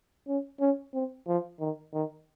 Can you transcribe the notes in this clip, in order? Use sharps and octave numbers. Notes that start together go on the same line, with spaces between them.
C#4
C#4
C4
F3
D#3
D#3